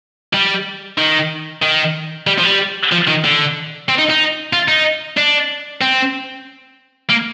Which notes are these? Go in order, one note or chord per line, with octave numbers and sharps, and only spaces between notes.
G3
D#3
D#3
G3
F3
G3
F3
D#3
D3
C4
D#4
D#4
F4
D#4
D4
C4
A#3